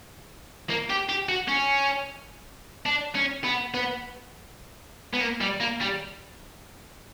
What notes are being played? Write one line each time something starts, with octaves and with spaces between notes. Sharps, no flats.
A#3
G4
G4
F#4
C#4
D4
C#4
B3
B3
B3
A#3
G3
A#3
G3